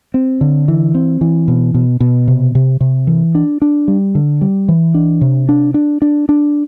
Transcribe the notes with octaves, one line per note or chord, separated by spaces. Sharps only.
C4
D3
E3
C4
E3
B2
B2
B2
C3
C3
C3
E3
D4
D4
G3
D3
G3
E3
D4
C3
D4
D4
D4
D4